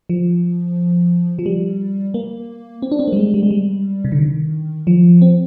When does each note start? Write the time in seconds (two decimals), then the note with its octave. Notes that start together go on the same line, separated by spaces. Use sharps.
0.09 F3
1.39 F3
1.46 G3
2.14 A#3
2.82 C4
2.92 D4
2.99 C4
3.08 A#3
3.12 G3
3.16 G#3
3.34 G3
3.43 G#3
3.51 G3
4.05 C3
4.12 D3
4.19 D#3
4.87 F3
5.22 C4